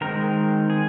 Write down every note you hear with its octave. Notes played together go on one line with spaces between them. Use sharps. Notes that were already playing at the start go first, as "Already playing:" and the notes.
D#3 G#3 C4 A#4
G#4